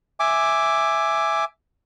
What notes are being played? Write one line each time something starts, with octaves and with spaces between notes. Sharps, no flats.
E5 G#5 D6